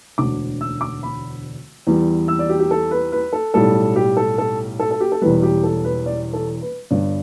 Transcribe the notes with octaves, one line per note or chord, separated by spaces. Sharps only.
E1 D2 D3 D6
E6
D6
B5
E2 E3 G3
E6
D5
G4
G4
A4
B4
B4
A4
B1 A2 G3 A4
G4
A4
A4
A4
A4
G4
A4
E1 E2 E3 G3 B4
G4
A4
B4
D5
A4
B4
G1 G2 G3 D5